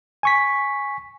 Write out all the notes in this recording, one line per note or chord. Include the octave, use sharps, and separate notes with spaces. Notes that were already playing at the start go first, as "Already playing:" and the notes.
G#5 C#6 B6